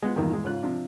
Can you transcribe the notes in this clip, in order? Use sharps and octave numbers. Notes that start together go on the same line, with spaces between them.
G#3 B3 F4
E2 G2 A#2 D#3 E3
E3 G#3
G#2 C#3 F4 F#6
C3 F3 D4